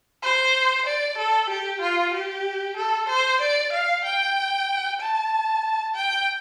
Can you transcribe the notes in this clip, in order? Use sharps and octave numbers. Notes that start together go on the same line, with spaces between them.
C5
D5
A4
G4
F4
G4
A4
C5
D5
F5
G5
A5
G5